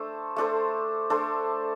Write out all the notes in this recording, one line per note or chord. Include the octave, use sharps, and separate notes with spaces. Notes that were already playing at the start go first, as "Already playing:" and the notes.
Already playing: A3 D4 A4 C5
A3 D4 A4 C5
A3 D4 A4 C5